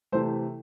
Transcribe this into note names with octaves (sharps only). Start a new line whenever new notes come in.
C3 E3 A3 C5